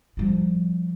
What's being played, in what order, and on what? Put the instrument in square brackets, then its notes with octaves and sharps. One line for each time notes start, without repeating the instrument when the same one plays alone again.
[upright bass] F3 G3